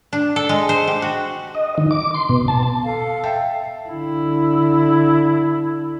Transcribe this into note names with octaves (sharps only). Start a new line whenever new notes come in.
D4
A4
G#3
C5
G4
F#4
D#5
D#3
D6
C6
B2
A5
A4 F5
E5 G5 A5
D3 E4